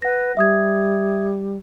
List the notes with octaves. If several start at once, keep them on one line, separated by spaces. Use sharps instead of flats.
B4 F#5 A#6
G3 E5 D#6 G#6